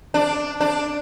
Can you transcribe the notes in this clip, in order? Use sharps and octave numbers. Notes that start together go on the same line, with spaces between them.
D4
D4